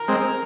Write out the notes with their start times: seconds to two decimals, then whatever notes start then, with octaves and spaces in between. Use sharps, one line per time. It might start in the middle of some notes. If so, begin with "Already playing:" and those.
Already playing: A#4
0.08 G#3 C4